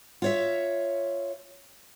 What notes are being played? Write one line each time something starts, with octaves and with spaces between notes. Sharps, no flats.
F4 C#5 E5